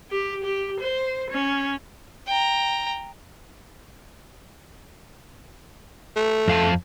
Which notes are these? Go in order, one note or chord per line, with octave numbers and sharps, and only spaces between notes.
G4
G4
C5
C#4
G5 A#5
A3
F2 F5 A5